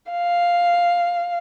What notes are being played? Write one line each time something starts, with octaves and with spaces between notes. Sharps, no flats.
F5